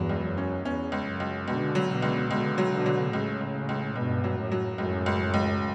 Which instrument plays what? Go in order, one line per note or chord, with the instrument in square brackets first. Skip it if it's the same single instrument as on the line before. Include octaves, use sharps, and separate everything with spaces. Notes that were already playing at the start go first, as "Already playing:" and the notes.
Already playing: [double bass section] E2 G2 [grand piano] F#3
[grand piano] C#2
[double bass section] F#2
[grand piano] C#4
[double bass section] E2 [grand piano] C#4
[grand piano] C#2
[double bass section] F#2
[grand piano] C#2
[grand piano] C#2 [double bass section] B2 D3
[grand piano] F#3
[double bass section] B2 D3
[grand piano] C#2
[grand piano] C#2 [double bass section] B2 D3
[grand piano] F#3
[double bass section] B2 D3
[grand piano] F#3
[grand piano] C#2 [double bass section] A2 C#3
[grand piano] C#2
C#2
[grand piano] C#2 [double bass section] G2 B2
[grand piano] F#3
[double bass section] F#2 A2
[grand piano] F#3
[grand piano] C#2 [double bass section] F#2 A2
[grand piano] C#2
C#2